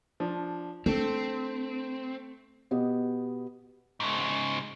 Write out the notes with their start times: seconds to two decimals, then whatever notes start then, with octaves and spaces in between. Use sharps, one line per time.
0.20 F3 D4
0.86 A3 C4 D4
2.71 B2 B3 G4 D#5
4.00 G#2 C#3